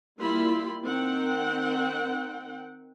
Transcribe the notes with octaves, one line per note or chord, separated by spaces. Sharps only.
G3 A#3 E4 F4 B5 C6
D#3 C4 F#5 G5